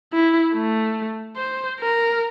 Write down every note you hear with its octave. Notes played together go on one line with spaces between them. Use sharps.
E4
A3
C5
A#4